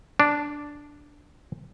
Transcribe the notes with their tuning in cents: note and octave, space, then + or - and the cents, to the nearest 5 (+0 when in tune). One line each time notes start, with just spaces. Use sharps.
D4 -5